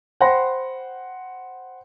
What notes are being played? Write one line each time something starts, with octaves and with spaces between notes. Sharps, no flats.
C5 F#5 G5 B5 C6 A#6